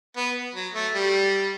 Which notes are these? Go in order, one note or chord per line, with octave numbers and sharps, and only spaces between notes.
B3
F#3
A3
G3